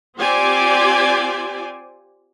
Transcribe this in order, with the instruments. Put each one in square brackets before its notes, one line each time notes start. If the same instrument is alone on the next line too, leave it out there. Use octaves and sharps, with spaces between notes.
[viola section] C4 F4 G4 C5 D5 G#5